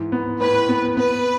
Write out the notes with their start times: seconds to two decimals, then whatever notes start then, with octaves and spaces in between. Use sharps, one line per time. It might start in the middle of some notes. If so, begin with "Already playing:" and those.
Already playing: G#2 E3
0.12 B3
0.41 A2 B4
0.69 B3
0.97 B3 B4